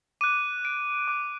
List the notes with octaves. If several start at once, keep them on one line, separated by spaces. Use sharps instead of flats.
D6 F#6 D#7
D7
D6 F#6